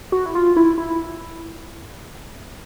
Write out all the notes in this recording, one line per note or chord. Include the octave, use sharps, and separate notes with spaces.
F#4
E4
F4
E4
E4